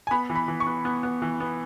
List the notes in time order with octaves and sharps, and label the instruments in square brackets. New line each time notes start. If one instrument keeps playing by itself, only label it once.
[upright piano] G#5
B3 B5
E3
B5
E3
C#6
B3
B3
B3
E3
B3